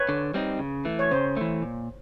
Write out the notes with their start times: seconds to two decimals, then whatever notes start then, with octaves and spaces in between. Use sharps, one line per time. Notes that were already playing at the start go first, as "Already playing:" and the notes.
Already playing: B4 C#5
0.09 D3
0.34 G3 C4 D#4
0.59 C#3
0.85 E3 A3
0.99 C#5
1.11 C#3 C5
1.37 E3 A3
1.62 A#2